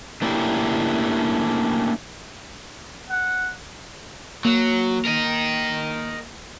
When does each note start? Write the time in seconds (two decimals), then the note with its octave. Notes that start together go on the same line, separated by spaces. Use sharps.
0.22 A3 A#3 C#4 D4 E4 G4
3.10 F#5
4.45 F#3 A#3
5.05 A#4 D#5